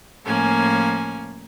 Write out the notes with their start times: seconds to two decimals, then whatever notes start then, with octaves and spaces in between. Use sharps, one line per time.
0.25 A2 F3 A#3 C#4 G#5